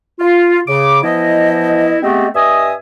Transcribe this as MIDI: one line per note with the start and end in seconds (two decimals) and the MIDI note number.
0.19 0.60 65
0.67 1.02 49
0.67 1.02 86
1.03 1.97 52
1.03 1.97 53
1.03 1.97 59
1.03 1.97 64
1.03 1.97 75
2.02 2.27 56
2.02 2.27 57
2.02 2.27 59
2.02 2.27 60
2.02 2.27 67
2.02 2.27 75
2.35 2.73 43
2.35 2.73 75
2.35 2.73 76
2.35 2.73 80
2.35 2.73 87